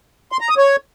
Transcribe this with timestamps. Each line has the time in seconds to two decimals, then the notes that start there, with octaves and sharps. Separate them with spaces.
0.32 C6
0.41 A#5
0.49 D#6
0.58 C#5